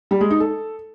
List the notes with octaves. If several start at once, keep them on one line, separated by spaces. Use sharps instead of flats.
G3
G#3
D#4
A4